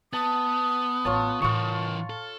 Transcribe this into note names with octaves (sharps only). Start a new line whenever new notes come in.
B3 A5 D#6
A1 A3 F4 C#5 A5
A2 E3 D#4 F4 A#4 C#6
A4